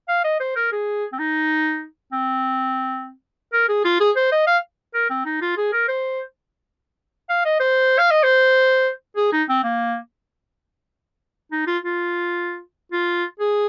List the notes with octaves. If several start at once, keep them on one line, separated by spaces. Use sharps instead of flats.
F5
D#5
C5
A#4
G#4
C4
D#4
C4
A#4
G#4
F4
G#4
C5
D#5
F5
A#4
C4
D#4
F4
G#4
A#4
C5
F5
D#5
C5
F5
D#5
C5
G#4
D#4
C4
A#3
D#4
F4
F4
F4
G#4